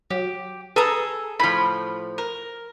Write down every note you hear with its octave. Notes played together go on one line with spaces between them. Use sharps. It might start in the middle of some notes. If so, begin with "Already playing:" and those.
F#3 G4
G#4 A4 B4 A#5
A2 F3 B5
A#4